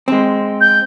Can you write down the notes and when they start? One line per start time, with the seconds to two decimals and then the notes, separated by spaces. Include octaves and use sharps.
0.08 G#3 C4
0.60 G6